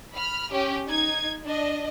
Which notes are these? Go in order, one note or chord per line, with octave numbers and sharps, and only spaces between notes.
B5 F6
C#4 G4
D#4 G#6
D4 D#5